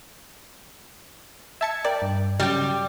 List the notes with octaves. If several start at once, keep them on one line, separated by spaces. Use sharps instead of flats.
E5 A5 G#6 C#7
A#4 D5 G5
G2
C#3 F#3 G3 G5 A6 A#6